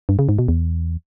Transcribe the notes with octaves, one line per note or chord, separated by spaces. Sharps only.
G2
C#3
G#2
B2
E2